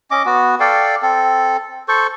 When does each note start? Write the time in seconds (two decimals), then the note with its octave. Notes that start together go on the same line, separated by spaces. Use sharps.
0.11 C#4 D#5 D6
0.26 B3 F#4
0.60 A4 D5 F5 G5
1.02 C4 A4
1.88 A4 C5 C#6